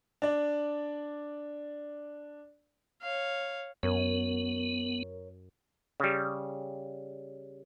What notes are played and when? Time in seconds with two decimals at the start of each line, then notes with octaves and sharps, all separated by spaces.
0.22 D4 D5
3.02 C#5 F5
3.83 F#2 B3 A#4 C#5
6.00 C#3 G3